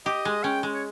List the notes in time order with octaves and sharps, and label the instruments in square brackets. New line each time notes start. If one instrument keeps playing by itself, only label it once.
[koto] G4 [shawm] D#5
[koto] G#3
[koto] C#4 [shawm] G5
[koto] G#3
[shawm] C#5